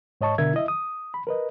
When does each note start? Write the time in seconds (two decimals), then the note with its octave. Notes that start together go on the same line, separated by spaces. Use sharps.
0.21 G#2 C#5 D#5 A5 C#6
0.38 B2 D3 D4 A#4 E5 G#6
0.54 E4 D#5 E5
0.68 D#6
1.14 B5
1.27 A#4 B4 D#5